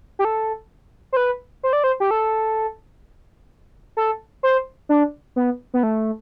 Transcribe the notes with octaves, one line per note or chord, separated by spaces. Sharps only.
G4
A4
C5
B4
C5
D5
C5
G4
A4
A4
C5
D4
B3
B3
A3